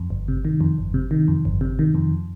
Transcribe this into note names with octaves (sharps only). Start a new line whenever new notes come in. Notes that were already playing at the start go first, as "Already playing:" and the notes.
Already playing: F2
G1
C3
D#3
F2
G1
C3
D#3
F2
G1
C3
D#3
F2